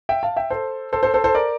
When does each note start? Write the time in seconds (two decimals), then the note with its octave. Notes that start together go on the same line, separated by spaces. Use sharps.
0.09 E5 G5
0.23 F5 A5
0.36 E5 G5
0.50 A4 C5
0.93 A4 C5
1.03 A4 C5
1.14 A4 C5
1.24 A4 C5
1.35 A#4 D5